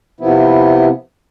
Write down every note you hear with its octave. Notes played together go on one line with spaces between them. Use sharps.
C3 F3 B3 E4